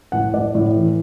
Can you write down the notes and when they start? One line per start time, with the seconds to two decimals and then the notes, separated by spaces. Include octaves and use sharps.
0.12 A2 F#5
0.34 A2 D5
0.55 A2
0.75 E3